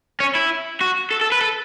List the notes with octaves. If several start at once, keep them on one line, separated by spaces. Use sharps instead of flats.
C#4
E4
F#4
A4
A4
B4
A4